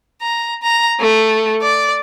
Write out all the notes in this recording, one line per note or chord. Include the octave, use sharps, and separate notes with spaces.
A#5
A#5
A3
D5